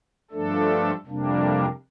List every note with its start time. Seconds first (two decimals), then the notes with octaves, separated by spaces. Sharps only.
0.31 G2 F3 A3 D4 A4
1.06 F2 C3 G3 A#3 D4